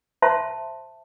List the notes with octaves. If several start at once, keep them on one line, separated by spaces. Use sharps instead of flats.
C5 E5 A5 C6